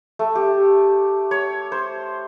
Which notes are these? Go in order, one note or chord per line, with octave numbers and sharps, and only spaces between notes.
A3
G4
C#5
C5